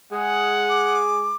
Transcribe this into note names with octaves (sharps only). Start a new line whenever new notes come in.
G#3 G#4 F#5
D6